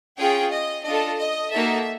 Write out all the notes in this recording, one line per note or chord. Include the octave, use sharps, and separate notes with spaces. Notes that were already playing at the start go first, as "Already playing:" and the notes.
C#4 F4 G#4 G5
D#5
D4 F4 A4 D#5
D#5
A#3 D#4 F#4 A4 E5